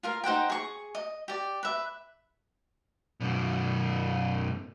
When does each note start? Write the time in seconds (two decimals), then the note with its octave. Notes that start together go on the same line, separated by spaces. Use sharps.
0.03 F4 A#4 F5
0.24 D#4 C5 F#5 G5
0.50 G#4 C#6
0.95 D#5
1.28 G4 D5
1.63 B4 E5
3.20 F#2 B2